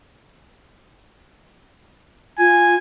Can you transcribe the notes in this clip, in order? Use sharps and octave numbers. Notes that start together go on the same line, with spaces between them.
F4 G#5